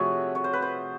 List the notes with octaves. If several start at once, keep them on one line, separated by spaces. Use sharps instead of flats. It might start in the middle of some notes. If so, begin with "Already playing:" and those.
Already playing: C3 F3 A3 F#4 G#4 C#5
C#5
C5
B4
C5